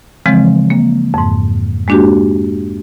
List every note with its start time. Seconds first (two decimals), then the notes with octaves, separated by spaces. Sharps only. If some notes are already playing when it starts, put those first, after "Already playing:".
0.26 C#3 E3 F3 G#3 C4
0.70 A#3
1.14 F2 G#2
1.88 G#3 A#3 D4 F#4 G4